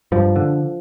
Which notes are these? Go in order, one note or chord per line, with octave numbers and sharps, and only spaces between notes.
G2 F3
D3